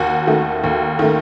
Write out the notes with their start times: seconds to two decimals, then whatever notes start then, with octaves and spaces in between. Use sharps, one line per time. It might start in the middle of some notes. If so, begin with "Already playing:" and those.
Already playing: D#2 F#4
0.27 D#3 A3
0.64 D#2
0.99 D#3 A3